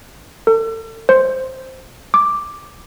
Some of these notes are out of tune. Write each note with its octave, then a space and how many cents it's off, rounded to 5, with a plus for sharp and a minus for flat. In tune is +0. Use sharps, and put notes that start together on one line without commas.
A4 +40
C5 +0
D6 +5